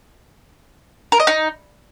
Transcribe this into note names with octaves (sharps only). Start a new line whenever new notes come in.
A#4
D#5
D#4